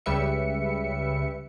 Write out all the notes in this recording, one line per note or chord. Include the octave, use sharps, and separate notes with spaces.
C#2 C#3 G3 B4 E5 C#7